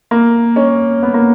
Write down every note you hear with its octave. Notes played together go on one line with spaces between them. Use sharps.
A#3
C#4
B3
A#3